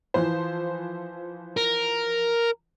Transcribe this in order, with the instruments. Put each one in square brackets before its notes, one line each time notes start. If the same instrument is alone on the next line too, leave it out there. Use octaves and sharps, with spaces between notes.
[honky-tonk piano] E3 F3 C5
[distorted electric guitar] A#4